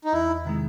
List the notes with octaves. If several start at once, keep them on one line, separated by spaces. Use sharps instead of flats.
D#4
E2 E4
C3 D#3 G#3